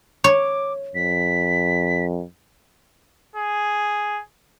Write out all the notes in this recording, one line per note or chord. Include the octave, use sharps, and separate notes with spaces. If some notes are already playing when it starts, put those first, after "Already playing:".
C#5 D6
F2 B6
G#4